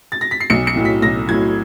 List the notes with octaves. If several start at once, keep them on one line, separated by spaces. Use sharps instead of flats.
A6
A#6
B6
C7
B1 C#7
C#7
A2 F#3
B6
B1 A#6
A2 F#3 G#6